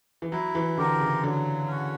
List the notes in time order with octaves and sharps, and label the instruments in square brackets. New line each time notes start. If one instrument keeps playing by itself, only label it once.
[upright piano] E3
[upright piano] F#3 [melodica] E4
[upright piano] E3
[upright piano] D3 [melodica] G4 A#4
[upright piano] C#3
[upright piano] D3 [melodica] F#3
[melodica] C#4 F#4